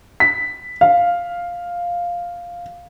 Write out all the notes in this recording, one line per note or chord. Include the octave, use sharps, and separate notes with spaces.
B6
F5